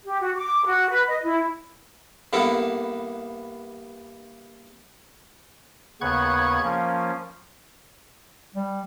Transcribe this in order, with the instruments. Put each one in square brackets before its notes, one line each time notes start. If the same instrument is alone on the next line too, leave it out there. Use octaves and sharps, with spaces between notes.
[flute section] G4
F#4
D6
F#4
B4
D#5
E4
[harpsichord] G2 A#3 B3 E4 A4
[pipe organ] D#2 C#3 B3 C#6 F#6 G#6
F3 A#3 C#4
[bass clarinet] G3